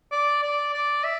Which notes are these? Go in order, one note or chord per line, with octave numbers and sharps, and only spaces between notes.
D5
D5
D5
E5